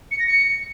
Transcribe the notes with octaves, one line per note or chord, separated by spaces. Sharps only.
C#7
A#6
C#7